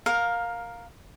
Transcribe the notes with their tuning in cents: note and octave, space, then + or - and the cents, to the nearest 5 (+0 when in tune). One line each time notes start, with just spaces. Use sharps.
A#4 +0 F5 +15